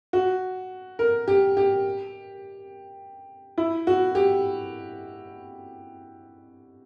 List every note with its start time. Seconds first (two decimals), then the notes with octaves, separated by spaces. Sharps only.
0.13 F#4
0.99 A#4
1.28 G4
1.57 G4
3.58 E4
3.87 F#4
4.15 G4